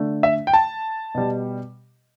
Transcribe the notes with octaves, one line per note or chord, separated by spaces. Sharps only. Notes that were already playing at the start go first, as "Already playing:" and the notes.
Already playing: D3 A3
E5
G5
A5
B2 G3